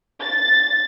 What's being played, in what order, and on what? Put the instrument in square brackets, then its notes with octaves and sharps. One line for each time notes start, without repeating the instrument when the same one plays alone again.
[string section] A6